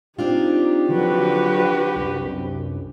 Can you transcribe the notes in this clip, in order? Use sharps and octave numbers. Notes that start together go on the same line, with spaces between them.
C4 D4 D#4 F4 G4
D3 F3 F#3 F#4 B4
C2 F#2